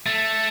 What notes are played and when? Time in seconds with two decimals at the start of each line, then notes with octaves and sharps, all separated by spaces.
0.06 A3